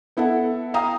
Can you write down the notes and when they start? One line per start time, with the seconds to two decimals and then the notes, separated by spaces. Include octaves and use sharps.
0.17 B3 E4 A4 F#5
0.74 F5 G5 A#5 D#6